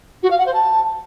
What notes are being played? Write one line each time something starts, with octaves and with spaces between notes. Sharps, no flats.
F#4
F5
F#5
C5
A5